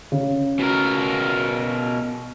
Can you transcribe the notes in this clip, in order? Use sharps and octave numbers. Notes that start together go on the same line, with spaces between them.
C#3
B2 A#4